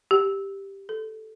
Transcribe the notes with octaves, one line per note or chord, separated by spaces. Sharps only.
G4
A4